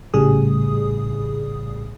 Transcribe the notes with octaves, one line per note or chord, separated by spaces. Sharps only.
A#1 A2 C#3 G3 G#4 D#6